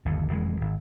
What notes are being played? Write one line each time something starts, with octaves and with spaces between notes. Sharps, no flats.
G1 D#2 D3
F#1 F2 E3 G#3
G#1